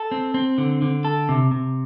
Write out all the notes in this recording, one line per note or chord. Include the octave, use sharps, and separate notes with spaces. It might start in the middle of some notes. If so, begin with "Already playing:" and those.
Already playing: A4
C4
C4
D3
D3
A4
C3
C3